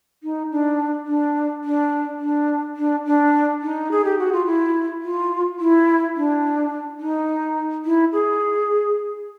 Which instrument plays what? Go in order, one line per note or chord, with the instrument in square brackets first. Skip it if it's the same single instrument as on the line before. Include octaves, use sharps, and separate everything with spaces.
[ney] D#4
D4
D4
D4
D4
D4
D4
D#4
G#4
G4
F#4
F4
E4
F4
E4
D4
D#4
E4
G#4